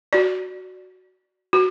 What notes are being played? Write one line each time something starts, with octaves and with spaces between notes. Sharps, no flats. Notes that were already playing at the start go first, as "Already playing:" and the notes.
F#4 D5
F#4